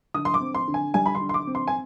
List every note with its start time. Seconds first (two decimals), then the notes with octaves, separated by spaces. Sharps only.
0.14 D3 D#6
0.25 C6
0.34 D6
0.41 C4
0.54 C6
0.68 D3
0.74 G#5
0.94 G3 G#5
1.06 B5
1.15 C6
1.21 D3
1.29 C6
1.34 D6
1.47 C4
1.55 C6
1.67 G#5